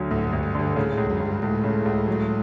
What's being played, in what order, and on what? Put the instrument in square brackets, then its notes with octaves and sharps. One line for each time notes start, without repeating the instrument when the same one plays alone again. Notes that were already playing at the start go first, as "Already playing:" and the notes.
Already playing: [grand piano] D2 D3 F#3
[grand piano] D2 [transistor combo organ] A2
[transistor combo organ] G2
[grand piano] D2
[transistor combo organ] G2
[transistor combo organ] G2 [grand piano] D3
[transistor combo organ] A2 [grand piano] C#3
[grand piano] C#2 [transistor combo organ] A2
[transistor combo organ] F#2
[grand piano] C#2
[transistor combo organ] G2
[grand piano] C#2 [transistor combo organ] A2
[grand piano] C#3
C#2
F#3